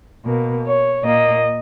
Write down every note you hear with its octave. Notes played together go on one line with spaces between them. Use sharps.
B2 A#3
C#5
A#2 A#3 D#5